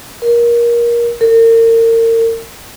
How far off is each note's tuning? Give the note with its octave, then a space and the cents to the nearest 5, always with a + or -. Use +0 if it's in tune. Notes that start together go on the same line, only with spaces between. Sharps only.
A#4 +20
A#4 -35